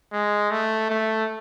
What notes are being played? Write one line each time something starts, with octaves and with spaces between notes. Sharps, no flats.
G#3
A3
A3